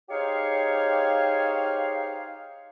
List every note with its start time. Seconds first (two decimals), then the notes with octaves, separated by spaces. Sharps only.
0.09 D#4 G4 G#4 C5 C#5 F5